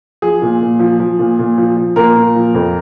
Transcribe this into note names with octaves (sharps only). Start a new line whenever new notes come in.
F3 G#4
A#2
A#2
F3
F3
A#2
A#2
F3
F3
A#2 A#4
A#2
F3
F2